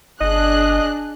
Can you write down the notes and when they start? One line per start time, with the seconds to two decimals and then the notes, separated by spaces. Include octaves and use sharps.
0.21 G1 D4 G#4 D#5 F#6